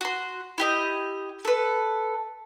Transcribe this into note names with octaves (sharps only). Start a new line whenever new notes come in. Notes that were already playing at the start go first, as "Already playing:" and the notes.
F#4 C6
E4 G4 D#5
A4 B4